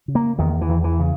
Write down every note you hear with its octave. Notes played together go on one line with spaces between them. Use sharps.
C#3
A#3
E2 D#3
E3
E2
E3
C#3